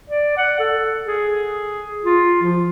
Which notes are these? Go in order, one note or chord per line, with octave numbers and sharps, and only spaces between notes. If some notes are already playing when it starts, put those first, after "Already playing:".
D5
F#5
A4
G#4
F4
F3